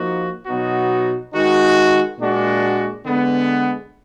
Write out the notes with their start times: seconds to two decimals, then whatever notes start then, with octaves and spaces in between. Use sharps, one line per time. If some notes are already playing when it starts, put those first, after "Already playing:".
Already playing: F3 A#3 D#4 F#4
0.46 B2 F#3 B3 D#4 F#4
1.32 D#3 G#3 D#4 F#4
2.18 A#2 G#3 D4 F#4
3.04 D3 G#3 B3